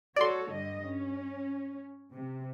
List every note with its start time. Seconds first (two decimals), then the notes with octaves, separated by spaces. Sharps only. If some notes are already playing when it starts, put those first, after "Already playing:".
0.16 F#4 A4 C#5 D5 C6
0.50 G2 D3 D#5
0.87 C#4
2.12 C3